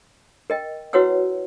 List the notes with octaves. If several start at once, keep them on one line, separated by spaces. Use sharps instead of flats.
A#4 D#5 G5
E4 F#4 B4 C#5 F#5 E6